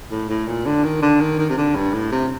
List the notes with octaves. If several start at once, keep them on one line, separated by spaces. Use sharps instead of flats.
A2
A2
A#2
D3
D#3
D3
D#3
D#3
C3
D3
G2
A2
C3